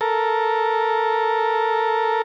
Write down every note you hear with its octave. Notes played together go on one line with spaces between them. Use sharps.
A4 A#4